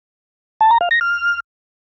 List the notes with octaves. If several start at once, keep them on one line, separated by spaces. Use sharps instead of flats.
A5
A#5
F5
A#6
F6